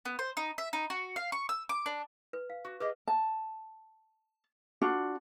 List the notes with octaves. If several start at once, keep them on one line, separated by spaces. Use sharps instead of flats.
B3
C5
D#4
E5
D#4
F#4
F5
C#6
E6
D6
D4
B4
F5
F#4
G4 G#4 B4 D#5
A5
D4 F4 F#4